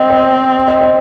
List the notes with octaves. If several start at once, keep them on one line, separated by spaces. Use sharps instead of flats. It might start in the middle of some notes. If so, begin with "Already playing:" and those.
Already playing: C4 D#5
C5
D#5
C5